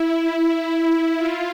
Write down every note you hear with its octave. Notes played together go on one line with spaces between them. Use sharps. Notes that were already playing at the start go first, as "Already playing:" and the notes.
Already playing: E4
F4